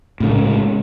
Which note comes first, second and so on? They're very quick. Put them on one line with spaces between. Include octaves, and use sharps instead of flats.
A2 C#3 G#3